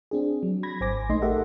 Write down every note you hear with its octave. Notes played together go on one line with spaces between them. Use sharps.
C4 D4 G#4
F#3
B5 G#6 A#6
G#1 C5 G#5 D6 A#6
A#1 A3 D#4 D#5 C6
G4 A4 A#4 D#5 E5 F#5